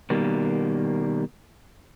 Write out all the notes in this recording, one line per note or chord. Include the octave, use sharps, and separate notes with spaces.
B2 D#3 G3 A#3